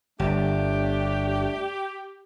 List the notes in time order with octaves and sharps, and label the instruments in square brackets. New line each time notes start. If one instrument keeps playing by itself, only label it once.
[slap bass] G1 [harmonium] A3 D4 [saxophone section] G4